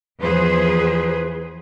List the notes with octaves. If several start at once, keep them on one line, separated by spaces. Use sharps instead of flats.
E2 F3 G#4 B4 C5